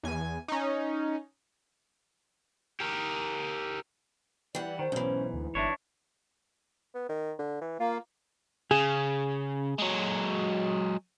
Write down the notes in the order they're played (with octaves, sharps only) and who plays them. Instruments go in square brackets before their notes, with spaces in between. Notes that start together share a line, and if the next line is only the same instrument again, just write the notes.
[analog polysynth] E2 G#5
C#4 D#4
[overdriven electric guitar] G4 A#4
[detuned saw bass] E3 [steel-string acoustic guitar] G3 F#5 [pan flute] D5
[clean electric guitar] D#3 [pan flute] C5
[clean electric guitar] B1 [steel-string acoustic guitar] G#2 E3 [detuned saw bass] C#4
[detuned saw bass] D2
[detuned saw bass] G1 [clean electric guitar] D4 E4 C#5 [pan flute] E5
[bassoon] B3
D#3
D3
E3
[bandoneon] A#3 [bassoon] F4
[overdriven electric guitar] C#3 [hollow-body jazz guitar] G#4
[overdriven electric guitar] F#3 G#3